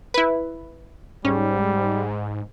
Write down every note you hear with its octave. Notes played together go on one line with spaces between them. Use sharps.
E4 B4
G#2 G3 C#4